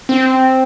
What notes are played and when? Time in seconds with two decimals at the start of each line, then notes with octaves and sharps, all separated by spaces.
0.09 C4